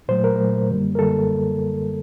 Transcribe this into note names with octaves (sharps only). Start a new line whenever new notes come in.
A#2 F#3 A3 C5
A#4
A#2 F#3 A3
F#2 D3 G3 A#3
A#4
F#2 D3 G3 A#3 A4